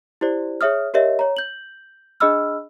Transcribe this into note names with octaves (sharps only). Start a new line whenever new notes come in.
E4 G4 C5 D5
G#4 C#5 E5 D#6 F6
G4 A#4 C#5 D#5 E5
C#5 A#5
G6 F#7
D4 G#4 D#5 B5 E6 F6